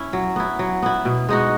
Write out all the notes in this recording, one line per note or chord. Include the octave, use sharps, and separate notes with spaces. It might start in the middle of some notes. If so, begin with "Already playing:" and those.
Already playing: C#4 E4
F#3
B3 E4
F#3
B3 E4
B2
G#3 D#4 F#4